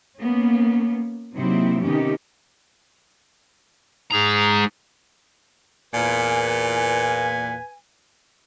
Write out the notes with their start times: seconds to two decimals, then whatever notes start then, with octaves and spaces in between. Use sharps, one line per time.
0.20 A#3 B3 C#4
1.35 C3 F#3 A#3 C4 D#4 E4
1.83 C3 D#3 B3 C#4 D#4 G4
4.12 G#2 G#3 G#4 A#5
5.94 E2 A#2 B4 G#5